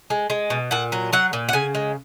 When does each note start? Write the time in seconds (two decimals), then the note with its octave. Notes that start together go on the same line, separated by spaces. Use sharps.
0.10 G#3
0.30 G#3
0.50 B2
0.71 A#2 F#5
0.92 F#3
1.13 F#3 F#5
1.33 A#2
1.49 F#5
1.53 C#3 G#5
1.75 G#3